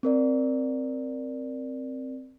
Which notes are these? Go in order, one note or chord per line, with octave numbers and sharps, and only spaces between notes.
C4 A#4 D5